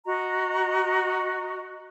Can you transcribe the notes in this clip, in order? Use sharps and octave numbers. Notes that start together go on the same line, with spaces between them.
F#4 D#5 A#5